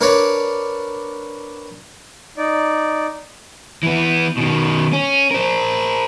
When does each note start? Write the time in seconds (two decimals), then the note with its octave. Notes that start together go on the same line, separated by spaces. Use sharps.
0.01 D4 A#4 B4 C#5
2.37 D#4 D5
3.83 E3 B3
4.37 B2 D#3
4.93 C#4
5.31 A#4 C5